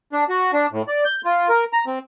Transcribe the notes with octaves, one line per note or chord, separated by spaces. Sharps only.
D4
F#4
D4
A2
D5
G6
F4
A#4
A#5
C4